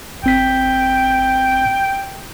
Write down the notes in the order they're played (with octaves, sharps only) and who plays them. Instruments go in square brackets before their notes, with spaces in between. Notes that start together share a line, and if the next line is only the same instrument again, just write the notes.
[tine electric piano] G#1 C4 B6 [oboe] G5